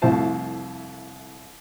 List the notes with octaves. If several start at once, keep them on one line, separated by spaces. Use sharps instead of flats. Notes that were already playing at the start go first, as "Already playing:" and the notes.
C2 F2 A2 C5 A5